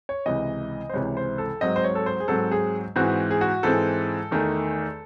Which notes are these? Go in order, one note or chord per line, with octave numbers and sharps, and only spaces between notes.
C#5
C#2 C3 E3 D#5
C5
C#2 C3 E3 C#5
C5
A4
G#2 F#3 C4 D#5
C5
C#5
A4
C5
G#4
G#2 F#3 C4 A4
G#4
G#2 E3 G#3 C4 F#4
G#4
F#4
G#2 E3 G#3 C4 A4
E2 D#3 A3